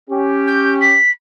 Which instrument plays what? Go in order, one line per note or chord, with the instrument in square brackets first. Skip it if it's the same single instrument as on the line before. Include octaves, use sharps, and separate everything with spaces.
[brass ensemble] C#4 G4
[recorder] G6
B6